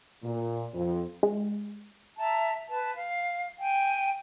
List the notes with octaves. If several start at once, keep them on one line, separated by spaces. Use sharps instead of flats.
A#2
F2
G#3
E5 A5 A#5
B4 A5
F5
G5 G#5